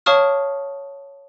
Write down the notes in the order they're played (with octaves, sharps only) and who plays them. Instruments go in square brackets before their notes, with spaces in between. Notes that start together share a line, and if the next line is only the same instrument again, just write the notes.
[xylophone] C#5 F5 A5 C#6 D#6 F6